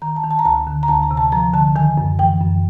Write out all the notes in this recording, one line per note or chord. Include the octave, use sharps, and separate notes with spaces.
D#3 A#5
A5
D#3
A5
A#5
D2 A5
D3
A#5
D2 A5
A#5
C3
A5
F3 A#5
D3 A5
D#3 G#5
F#2
E3 G5
F#2